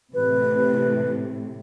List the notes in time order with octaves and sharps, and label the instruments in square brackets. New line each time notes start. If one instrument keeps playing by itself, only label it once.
[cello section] A2 C3 E3 [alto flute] B4